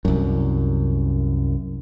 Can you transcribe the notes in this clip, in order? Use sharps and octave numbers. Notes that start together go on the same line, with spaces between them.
C2 F#2